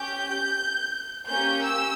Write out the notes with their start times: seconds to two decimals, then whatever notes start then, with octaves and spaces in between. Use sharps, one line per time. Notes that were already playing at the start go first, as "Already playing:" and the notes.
Already playing: C#4 G4 G6
1.28 A#3 C#4 G4 G6
1.65 E6